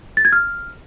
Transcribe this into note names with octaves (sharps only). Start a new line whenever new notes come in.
A6
G#6
F6